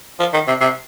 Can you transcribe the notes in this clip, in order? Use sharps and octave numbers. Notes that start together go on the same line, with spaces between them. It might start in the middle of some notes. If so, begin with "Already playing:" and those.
F3
D#3
C3
C3